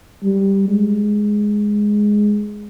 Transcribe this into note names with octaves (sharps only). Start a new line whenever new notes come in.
G3
G#3